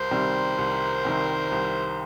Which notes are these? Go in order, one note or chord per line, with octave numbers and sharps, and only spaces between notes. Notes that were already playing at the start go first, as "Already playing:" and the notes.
Already playing: C2 A#4 C5
C3 D#3 G3 C4
C2
C3 D#3 G3 C4
C2